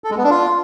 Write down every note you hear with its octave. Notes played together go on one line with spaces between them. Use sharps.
A4
G#3
B3
D4
F4